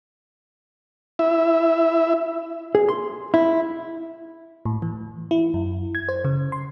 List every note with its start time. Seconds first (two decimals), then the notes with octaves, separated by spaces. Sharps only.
1.19 E4 E5
2.75 G#4
2.89 C6
3.34 E4
4.65 A2
4.82 E3
5.31 E4
5.54 F#2
5.95 G#6
6.09 C5
6.25 C#3
6.52 C6